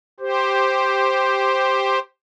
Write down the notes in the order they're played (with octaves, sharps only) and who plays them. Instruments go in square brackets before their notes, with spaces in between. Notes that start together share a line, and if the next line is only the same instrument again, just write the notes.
[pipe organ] G4 C5